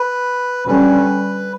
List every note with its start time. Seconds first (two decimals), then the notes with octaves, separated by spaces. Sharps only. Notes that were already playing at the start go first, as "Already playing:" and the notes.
Already playing: B4
0.68 D3 G3 C#4 B4